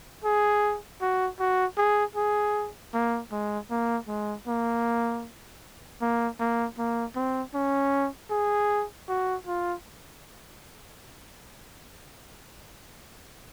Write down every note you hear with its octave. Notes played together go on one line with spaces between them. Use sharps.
G#4
F#4
F#4
G#4
G#4
A#3
G#3
A#3
G#3
A#3
A#3
A#3
A#3
C4
C#4
G#4
F#4
F4